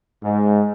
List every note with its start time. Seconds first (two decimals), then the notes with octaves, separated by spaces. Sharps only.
0.22 G#2